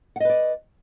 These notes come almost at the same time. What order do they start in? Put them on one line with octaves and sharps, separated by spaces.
F#5 D#5 B4 D5